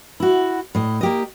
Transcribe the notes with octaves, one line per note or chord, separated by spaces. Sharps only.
E4 F#4
A2 D#5
A#3 G4 D#5